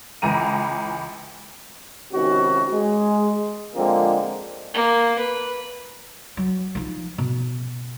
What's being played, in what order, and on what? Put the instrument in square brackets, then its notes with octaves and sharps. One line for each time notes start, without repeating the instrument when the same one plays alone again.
[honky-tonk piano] C#2 E3 A#5 D#7
[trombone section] C#2 C3 D#3 C#4 D#4 F#4
G#3
D3 F3 G#3 A#3 C4
[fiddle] A#3
B4
[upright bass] F#3
F3 D#4
B2